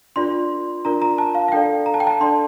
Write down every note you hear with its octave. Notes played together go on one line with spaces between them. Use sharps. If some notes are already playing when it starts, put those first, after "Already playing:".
D4 F4 A#4 D5 C6
D4 F4 A#4 D5 A#5
A#5
A5
F5
F5
D4 A4 D5 G5
A#5
A5
G5
A5
D4 A4 D5 C6